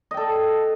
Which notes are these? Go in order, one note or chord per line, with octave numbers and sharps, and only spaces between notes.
A4 D#5 G5